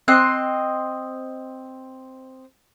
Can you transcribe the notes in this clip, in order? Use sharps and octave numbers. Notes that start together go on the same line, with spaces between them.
C4 D#5 C6 F#6